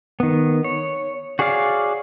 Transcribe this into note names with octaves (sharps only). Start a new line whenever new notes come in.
D#3 B3
C#5
F#4 G#4 C#5 D5 F5